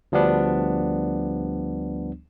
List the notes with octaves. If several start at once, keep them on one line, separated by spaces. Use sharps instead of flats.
D2 F3 G3 B3 D4